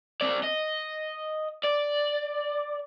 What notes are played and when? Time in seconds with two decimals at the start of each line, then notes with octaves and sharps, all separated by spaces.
0.21 C4 D5
0.44 D#5
1.64 D5